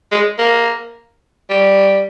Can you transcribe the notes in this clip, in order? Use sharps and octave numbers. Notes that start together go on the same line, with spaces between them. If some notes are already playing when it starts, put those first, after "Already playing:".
G#3
A#3
G3